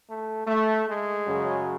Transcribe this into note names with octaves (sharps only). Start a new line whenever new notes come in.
A3
A3
G#3
F#2 C#3 F#3